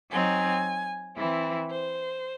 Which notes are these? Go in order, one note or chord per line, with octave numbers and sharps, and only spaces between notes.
F#3 C4 D#4 G#5
E3 C4 E4
C5